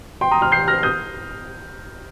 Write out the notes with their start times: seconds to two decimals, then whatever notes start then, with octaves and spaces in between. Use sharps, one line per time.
0.21 G5 C6
0.31 A#5 D#6
0.41 C6 F6
0.52 G6 C7
0.68 F6 A#6
0.83 D#6 G6